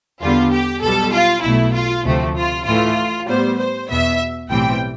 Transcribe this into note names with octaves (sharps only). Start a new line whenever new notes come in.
E2 D3 G3 B3 F4
G4
B1 B2 G3 B3 A4
F4
B1 B2 A3 E4
F4
D2 C3 F3 A3 C4
F4
A2 E3 A3 F4
A2 G3 B3 C5
C5
E2 B2 B3 E5
B1 A2 E3 G3 C4 G5